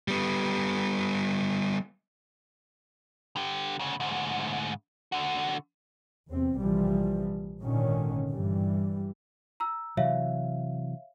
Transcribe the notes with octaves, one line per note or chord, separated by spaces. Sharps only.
G3 B3
D3 G4
D2 C#3
D2 G#2
D3 F#4
E2 C3 C4
A#1 C3 E3 F3 G3
G#1 A#2 D3 D#3 C#4
G2 E3 G3
A#5 E6
C3 E3 F#3 C#5 E5 F5